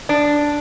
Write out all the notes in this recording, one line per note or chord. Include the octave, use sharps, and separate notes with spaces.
D4